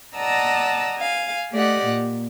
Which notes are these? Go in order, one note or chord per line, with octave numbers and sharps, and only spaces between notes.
D5 D#5 F#5 A5 A#5 E6
F5 G#5
A3 G4 D5 D#5 F#5
A#2